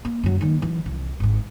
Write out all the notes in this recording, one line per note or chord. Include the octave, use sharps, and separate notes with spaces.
A#3
F#2 F#3
D#3 A#3
E3 F#3
C2
G#1 G#2